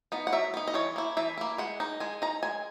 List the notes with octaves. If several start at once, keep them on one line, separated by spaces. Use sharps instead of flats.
B3 D#4
F#5
F#3 E5
B3 D#4
D#5
E3 C#5
A#3 E4
E3 E5
A#3 E4
G#3 F#5
D#4
G#3 G#5
D#4 A#5
G#3 G#5